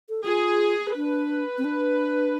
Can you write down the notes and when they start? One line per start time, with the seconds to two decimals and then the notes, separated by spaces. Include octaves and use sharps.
0.09 A4
0.25 F4 G#4
0.95 D4 B4
1.58 C4
1.65 D4